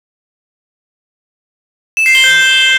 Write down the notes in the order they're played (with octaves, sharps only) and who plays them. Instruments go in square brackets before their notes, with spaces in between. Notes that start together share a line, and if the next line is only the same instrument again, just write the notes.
[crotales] E7
C7
G7
G6